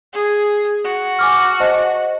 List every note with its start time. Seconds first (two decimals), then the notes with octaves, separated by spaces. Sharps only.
0.14 G#4
0.84 F#4
1.19 G#5 D6 F6
1.60 C5 D#5 A5